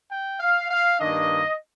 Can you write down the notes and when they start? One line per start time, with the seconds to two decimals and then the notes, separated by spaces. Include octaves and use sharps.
0.10 G5
0.40 F5
0.70 F5
0.99 G2 D#3 A#3 D4 D#5